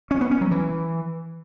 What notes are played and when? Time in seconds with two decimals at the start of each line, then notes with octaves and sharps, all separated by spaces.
0.11 C#4
0.21 B3
0.31 C#4
0.41 F#3
0.51 E3